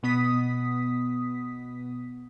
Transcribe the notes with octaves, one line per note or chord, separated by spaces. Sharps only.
B2 B3 D#6 B6